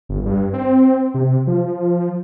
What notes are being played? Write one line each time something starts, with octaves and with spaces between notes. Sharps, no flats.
G1
G2
C4
C3
F3